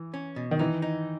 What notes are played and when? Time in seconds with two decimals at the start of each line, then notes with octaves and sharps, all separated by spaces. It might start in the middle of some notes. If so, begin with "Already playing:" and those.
Already playing: E3
0.14 C#4
0.36 B2
0.51 D#3
0.59 E3 D#4
0.82 D#4